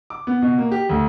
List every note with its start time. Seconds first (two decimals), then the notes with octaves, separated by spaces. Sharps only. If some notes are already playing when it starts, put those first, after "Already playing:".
0.10 D6
0.27 B3
0.42 B2
0.58 A#3
0.72 G4
0.89 D2